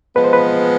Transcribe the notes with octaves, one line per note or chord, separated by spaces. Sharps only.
F3 G#3 B3 B4
C5
B4